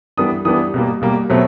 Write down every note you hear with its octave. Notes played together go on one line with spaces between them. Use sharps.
E3 G3 B3 D4 D#6
E3 G3 B3 D4 D#6
B2 G3 A#3
B2 G3 A#3
B2 F#3 A3 C4